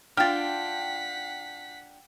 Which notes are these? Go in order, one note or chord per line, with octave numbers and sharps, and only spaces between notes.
D4 F4 F#5 G5 F6 A6 B6